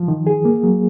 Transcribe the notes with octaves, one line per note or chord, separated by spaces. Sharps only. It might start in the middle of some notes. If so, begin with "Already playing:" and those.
Already playing: F3
D#3
G#4
A#3
F#3